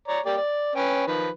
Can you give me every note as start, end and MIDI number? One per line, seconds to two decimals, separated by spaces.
0.08 0.20 73
0.08 0.20 74
0.08 0.20 82
0.25 0.37 58
0.25 0.37 67
0.25 0.37 74
0.37 0.74 74
0.75 1.06 61
0.75 1.06 71
0.75 1.06 79
1.07 1.30 51
1.07 1.30 53
1.07 1.30 71